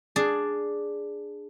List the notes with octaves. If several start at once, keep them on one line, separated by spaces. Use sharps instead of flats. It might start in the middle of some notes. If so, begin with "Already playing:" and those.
D4 G#4 D5